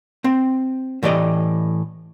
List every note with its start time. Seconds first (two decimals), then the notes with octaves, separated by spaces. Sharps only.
0.24 C4
1.03 A2 E3 G4 D5 D#5